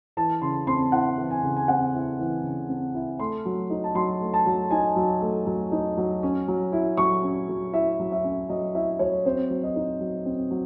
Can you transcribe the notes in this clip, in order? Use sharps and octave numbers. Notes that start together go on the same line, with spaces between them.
E3 A5
C#3 C6
C4 C6
E4 F#5
E3
G#5
C#3
G#5
C4 F#5
E4
E3
C#3
C4
E4
A3 C6
F#3
D#4
A5
F#3 C6
A3
A5
F#3
D#4 G#5
F#3
A3
F#3
D#4
F#3
C#4
F#3
E4
F#3 C#6
C#4
F#3
E4 E5
F#3
E5
C#4
F#3 D#5
E4 E5
F#3 C#5
C4 C5
F#3
D#5
D#4
F#3
C4
F#3